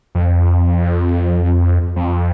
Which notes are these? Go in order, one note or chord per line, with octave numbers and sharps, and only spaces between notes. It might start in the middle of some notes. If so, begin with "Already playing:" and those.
F2
F2